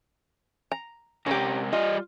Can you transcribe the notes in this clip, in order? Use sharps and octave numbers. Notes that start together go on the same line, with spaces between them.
A#5
C3 C#4 G4 A#4
G3 F4 D#5